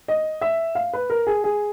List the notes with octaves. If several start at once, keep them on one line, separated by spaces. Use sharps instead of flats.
D#5
E5
F5
B4
A#4
G#4
G#4